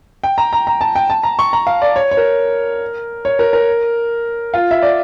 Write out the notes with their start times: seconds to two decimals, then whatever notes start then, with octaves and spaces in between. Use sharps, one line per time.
0.24 G5
0.38 A#5
0.53 A#5
0.67 A#5
0.81 A5
0.95 G5
1.10 A5
1.23 A#5
1.39 C#6
1.53 A#5
1.67 F5
1.82 D5
1.96 C#5
2.11 C#5
2.17 A#4
3.25 C#5
3.39 A#4
3.53 A#4
4.54 F4
4.71 E5
4.82 D5